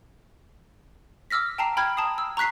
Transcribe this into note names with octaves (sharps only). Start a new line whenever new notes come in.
D6 E6 F6 A#6 B6
G5 A5 A#5 C7
G5 B5 F6 G#6
A5 A#5 D#6 C7
E6
A#5 C#6 F#6 B6 C7